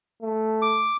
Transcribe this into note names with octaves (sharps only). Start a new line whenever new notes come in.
A3
D6